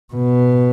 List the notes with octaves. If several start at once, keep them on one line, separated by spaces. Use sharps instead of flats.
B2